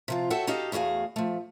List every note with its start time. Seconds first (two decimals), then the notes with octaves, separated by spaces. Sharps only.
0.08 C3 F3 F4
0.30 F#4 A4 C#5 E5 F#5 G5
0.47 D#4 F#4 G4 A4 D#5 F5
0.72 E2 A3 F#4 G#4 F5
1.16 F3 A3